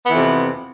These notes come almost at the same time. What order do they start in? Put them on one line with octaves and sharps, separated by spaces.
B3 E3 F2 C3